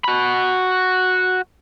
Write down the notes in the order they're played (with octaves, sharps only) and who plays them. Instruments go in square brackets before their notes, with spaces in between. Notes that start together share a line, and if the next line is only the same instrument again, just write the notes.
[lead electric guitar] F#4 B5